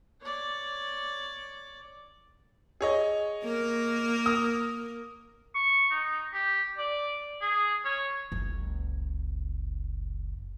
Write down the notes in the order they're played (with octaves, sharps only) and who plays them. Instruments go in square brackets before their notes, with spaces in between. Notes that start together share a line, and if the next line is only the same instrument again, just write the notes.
[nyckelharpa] C#5 D5
[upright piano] G#4 C#5 D#5
[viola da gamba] A#3 A#4
[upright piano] D#6
[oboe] C#6
D#4
G4
D5
G#4
C#5
[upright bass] F#1 C#2